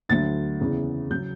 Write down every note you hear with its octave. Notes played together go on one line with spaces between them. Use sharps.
D2 D3 F#3 A6
E2 C#3 E3
C#3 F#3 G6